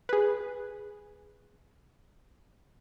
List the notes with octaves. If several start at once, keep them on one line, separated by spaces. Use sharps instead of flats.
G#4 B4